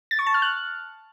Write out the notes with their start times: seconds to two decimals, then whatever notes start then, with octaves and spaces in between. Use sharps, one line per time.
0.11 A6
0.19 C#6
0.27 A5
0.34 F6
0.42 F#6